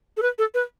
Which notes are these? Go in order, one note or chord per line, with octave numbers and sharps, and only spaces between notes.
A4
B4
A4
B4